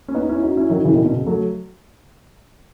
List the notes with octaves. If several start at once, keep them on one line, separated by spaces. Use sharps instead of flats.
C#4
B3 D#4
C#4 E4
D#4 F#4
C#4 E4
D#3 F#3
C#3 E3
B2 D#3
B2
C#3
F#3 A3